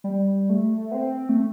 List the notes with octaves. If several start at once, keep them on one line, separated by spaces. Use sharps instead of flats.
G3
A3
B3
C4
A3